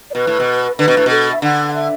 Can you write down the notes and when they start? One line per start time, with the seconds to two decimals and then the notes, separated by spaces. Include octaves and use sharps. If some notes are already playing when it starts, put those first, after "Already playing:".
0.10 D5
0.15 B2 B4
0.27 A2
0.40 B2
0.78 D3 B4
0.88 B2
0.97 A2
1.06 B2 A4
1.32 E5
1.42 D3 F#5
1.68 F#5
1.74 E5